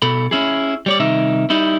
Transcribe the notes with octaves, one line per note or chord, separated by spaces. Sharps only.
B2 A4 B5
C#4 E4 G#4
G3 C#5 D5
C2 D#3 D#4 E5
G3 D#4 E4